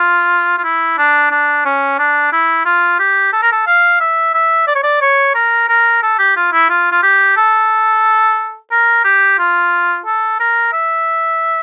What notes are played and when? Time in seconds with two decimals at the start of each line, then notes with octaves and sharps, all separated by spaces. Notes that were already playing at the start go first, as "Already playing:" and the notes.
Already playing: F4
0.58 F4
0.64 E4
0.98 D4
1.31 D4
1.65 C#4
1.99 D4
2.32 E4
2.66 F4
3.00 G4
3.33 A4
3.43 A#4
3.52 A4
3.67 F5
4.00 E5
4.34 E5
4.68 D5
4.75 C#5
4.84 D5
5.02 C#5
5.35 A#4
5.69 A#4
6.03 A4
6.19 G4
6.36 F4
6.53 E4
6.70 F4
6.92 F4
7.03 G4
7.37 A4
8.72 A#4
9.05 G4
9.39 F4
10.06 A4
10.40 A#4
10.73 E5